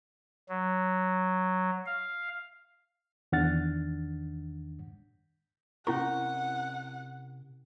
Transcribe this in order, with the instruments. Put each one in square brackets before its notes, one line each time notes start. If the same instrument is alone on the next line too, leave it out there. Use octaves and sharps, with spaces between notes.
[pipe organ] F#3
F5
[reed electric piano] E2 D#3 D4 F#5 F6 A6
[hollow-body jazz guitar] C3 A#4 [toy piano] C#4 E4 C#6 [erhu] F#5